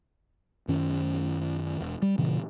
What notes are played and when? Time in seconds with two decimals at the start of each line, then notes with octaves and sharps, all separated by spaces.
0.68 F#2 D#3 C#4
1.81 E1
2.02 G3
2.18 G2 A#2 C#3 E3